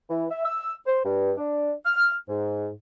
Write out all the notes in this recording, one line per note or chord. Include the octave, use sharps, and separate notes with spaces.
E3
E5
E6
C5
G2
D4
F6
G#2